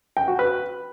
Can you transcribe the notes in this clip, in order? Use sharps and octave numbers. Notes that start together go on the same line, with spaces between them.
G5
F#4
B4